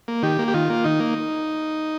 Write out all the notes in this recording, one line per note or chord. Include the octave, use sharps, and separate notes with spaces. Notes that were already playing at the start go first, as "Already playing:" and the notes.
A#3
D#3 G4
A#3
G4
D#3 F4
A#3
D#3 D#4
A#3